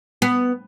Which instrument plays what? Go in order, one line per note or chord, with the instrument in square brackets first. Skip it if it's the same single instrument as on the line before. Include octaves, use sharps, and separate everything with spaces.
[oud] B3